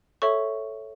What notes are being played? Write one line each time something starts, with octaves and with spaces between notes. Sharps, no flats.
A4 C#5 E5 C#6